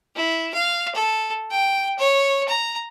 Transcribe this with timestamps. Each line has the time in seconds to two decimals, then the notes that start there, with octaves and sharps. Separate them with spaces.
0.15 E4
0.54 F5
0.95 A4
1.51 G5
1.99 C#5
2.49 A#5